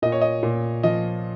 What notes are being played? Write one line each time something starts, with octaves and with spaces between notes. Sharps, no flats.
A#2 D#5
C#5
D#5
A#2
F3 D#5